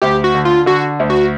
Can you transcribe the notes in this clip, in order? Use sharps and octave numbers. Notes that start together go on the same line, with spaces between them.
D2 G4
F#4
D3
F4
D3 F#4
D2
F#4